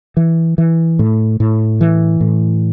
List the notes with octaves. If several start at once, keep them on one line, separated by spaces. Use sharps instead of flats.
E3
E3
A2
A2
E3
A2